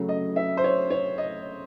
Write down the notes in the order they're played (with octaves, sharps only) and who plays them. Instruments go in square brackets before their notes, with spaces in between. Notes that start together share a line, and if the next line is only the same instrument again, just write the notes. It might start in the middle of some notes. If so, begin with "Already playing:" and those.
Already playing: [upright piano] C#3 F#3 A3
D#5
E5
C5
C#5
C#5
D#5